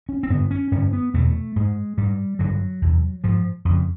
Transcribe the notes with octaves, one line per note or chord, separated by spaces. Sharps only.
C#4
C4
G2 D3 B3
C#4
G2 D3 C#4
B3
E2 B2 A3
G#2 G#3
G#2 G3
G2 D3 F#3
E2 C3
G#2 F3
F2 C#3